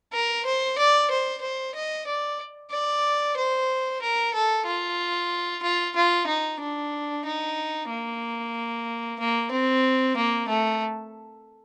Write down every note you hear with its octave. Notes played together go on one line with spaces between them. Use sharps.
A#4
C5
D5
C5
C5
D#5
D5
D5
C5
A#4
A4
F4
F4
F4
D#4
D4
D#4
A#3
A#3
C4
A#3
A3